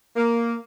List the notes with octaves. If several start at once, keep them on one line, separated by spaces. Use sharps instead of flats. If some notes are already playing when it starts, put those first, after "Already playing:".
A#3